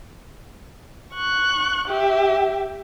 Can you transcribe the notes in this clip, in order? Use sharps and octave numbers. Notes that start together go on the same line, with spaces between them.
C#6 F#6
G4 E5